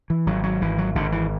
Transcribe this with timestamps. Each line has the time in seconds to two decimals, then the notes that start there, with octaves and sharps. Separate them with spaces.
0.10 E3
0.26 G#1 F#3
0.43 F#3
0.61 G#1 E3
0.78 F#3
0.95 G#1 D3
1.12 E3